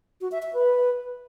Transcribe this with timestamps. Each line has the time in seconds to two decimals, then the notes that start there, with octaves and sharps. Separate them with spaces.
0.21 F#4
0.32 E5
0.43 E5
0.53 B4